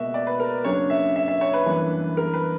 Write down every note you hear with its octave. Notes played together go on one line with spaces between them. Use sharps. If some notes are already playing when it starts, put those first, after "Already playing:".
Already playing: C#2 B2 A#3 F#4 E5
D5
B4
A#4
F#2 C#3 F#3 A#3 D4 C#5
E5
E5
E5
C#5
B4
G1 F#2 E3 A#3 D4
A#4
B4